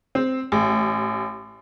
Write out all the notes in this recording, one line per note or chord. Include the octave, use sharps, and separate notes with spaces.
C4
A1